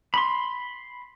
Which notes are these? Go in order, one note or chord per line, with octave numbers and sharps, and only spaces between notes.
B5 C6